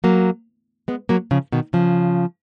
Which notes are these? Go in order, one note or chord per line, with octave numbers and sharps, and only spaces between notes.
F#3 A#3
G#3 B3
F#3 A#3
C#3 F3
B2 D#3
C#3 F3